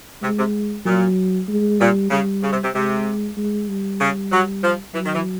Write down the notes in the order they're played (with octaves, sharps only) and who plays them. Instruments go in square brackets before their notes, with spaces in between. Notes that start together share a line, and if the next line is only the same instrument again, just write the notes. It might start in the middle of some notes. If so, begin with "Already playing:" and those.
[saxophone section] C3 [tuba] G#3
[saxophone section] C3
[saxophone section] A#2 [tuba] F#3
[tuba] G#3
[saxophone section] A#2 [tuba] G3
[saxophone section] C#3 [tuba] G3
[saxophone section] C#3
C3
C3
[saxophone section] C3 [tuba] G#3
[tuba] G#3
G3
[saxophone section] C#3
F#3
F3
[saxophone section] E3 [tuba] F#3
[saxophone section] D#3
E3